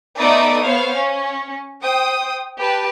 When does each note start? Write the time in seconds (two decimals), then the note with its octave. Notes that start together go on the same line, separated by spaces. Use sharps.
0.18 A3 B3 D#4 D5 E5 D#6
0.63 B3 C5 C#5 F5
0.94 C#4
1.81 C5 G5 D#6
2.59 G4 B4 A5